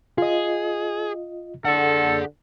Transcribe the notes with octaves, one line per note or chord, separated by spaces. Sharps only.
F4 G#4 D#5
D3 G#4 A4 F#5